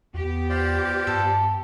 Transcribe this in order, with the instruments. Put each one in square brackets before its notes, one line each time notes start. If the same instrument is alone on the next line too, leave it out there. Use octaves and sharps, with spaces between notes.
[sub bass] E2 [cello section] B3 G4
[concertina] F4 C5 D5
[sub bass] G2 [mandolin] A4